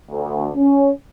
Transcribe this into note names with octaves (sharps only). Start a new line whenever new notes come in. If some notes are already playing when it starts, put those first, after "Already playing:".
D2
C#4